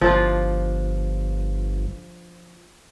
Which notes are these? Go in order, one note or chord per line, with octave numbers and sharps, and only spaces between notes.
G1 F3 D4 F4